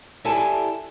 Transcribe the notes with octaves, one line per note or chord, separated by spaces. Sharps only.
E4 G4 A4 D5 G#5 A5